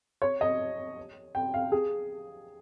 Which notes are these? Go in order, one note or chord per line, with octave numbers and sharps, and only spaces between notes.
C#5
D#5
G5
F5
G#4